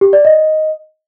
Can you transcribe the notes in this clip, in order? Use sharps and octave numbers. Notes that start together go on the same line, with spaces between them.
G4
D5
D#5